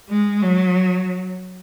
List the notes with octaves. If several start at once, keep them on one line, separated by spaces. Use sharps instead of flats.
G#3
F#3